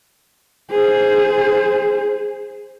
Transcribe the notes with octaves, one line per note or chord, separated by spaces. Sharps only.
G#4 C5